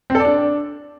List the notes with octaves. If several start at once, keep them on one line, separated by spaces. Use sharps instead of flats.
C4
A4
D5
D4